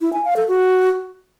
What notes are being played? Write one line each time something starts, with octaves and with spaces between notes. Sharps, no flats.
E4
G#5
F5
A4
F#4